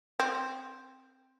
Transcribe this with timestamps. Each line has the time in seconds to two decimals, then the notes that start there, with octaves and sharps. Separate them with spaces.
0.20 C4